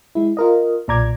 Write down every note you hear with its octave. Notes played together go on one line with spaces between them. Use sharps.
G#3 E4
F4 A#4 D#5
B1 A#2 D5 A#5 D6 G#6